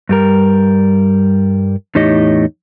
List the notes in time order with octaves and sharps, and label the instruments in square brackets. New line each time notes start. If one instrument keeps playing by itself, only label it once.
[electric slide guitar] G2 G3 A#4
E2 A2 D#4 G4 C#5 D#5